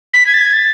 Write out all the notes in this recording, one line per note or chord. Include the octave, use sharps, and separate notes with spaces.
B6
G#6
A6
G#6
A6